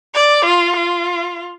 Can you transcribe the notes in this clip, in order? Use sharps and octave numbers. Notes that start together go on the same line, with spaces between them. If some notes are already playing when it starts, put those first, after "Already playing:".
D5
F4
F4